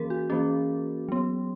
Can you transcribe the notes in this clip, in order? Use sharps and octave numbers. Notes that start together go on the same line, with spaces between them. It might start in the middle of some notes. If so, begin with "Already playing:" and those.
Already playing: E3 A#3 C#4 G#4 A#4
F#4
E3 A#3 C#4 G#4
F#3 B3